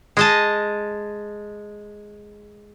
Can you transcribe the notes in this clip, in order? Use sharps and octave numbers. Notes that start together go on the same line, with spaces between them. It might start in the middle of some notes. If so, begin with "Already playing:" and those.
G#3 D#5 A5